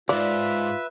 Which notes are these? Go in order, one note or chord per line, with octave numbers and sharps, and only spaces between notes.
C#2 G#2 F4 B4 D5 E5